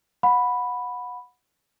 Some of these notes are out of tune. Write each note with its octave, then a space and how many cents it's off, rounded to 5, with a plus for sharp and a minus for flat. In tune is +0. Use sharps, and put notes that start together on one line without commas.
F#5 -25 B5 +0